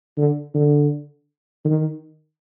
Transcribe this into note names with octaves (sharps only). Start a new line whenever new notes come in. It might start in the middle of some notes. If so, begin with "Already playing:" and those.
D3
D3
D#3